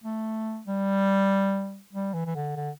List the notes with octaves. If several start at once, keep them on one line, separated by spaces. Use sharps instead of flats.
A3
G3
G3
E3
E3
D3
D3